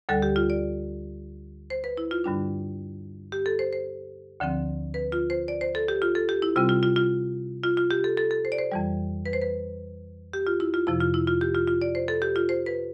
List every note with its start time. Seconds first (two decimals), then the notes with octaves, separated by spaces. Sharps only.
0.09 D2 D3 G3 A4
0.22 G4
0.36 F4
0.50 D5
1.70 C5
1.84 B4
1.97 E4
2.11 F4
2.24 G2 D3 G3 D4
3.32 G4
3.46 A4
3.59 C5
3.73 C5
4.40 D2 D3 F3 C4
4.94 B4
5.12 F4
5.30 C5
5.48 D5
5.61 C5
5.75 A4
5.88 G4
6.02 F4
6.15 A4
6.29 G4
6.42 E4
6.56 C3 G3 C4 F4
6.69 F4
6.83 F4
6.96 F4
7.64 F4
7.77 F4
7.91 G4
8.04 A4
8.17 A4
8.31 A4
8.45 C5
8.52 D5
8.58 C5
8.72 F2 E3 G3
9.26 B4
9.33 C5
9.42 B4
10.33 G4
10.47 F4
10.60 E4
10.74 F4
10.87 F2 C3 F3 E4
11.00 F4
11.14 E4
11.27 F4
11.41 G4
11.55 F4
11.67 F4
11.82 D5
11.95 C5
12.08 A4
12.22 G4
12.36 F4
12.49 C5
12.66 B4